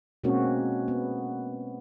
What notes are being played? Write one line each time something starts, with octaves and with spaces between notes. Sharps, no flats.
B2 G#3 A#3 C4 C#4 F#4
B3